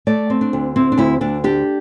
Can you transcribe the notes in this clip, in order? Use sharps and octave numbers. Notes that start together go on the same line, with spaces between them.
A3 D5
C4
D4
D2
C4 E4
D4
D2 E4
D2 D4
D4 G4